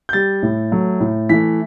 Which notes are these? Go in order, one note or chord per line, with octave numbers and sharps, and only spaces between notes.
G6
G3 A6
A2
F#3 A3
A2
E3 A3 B6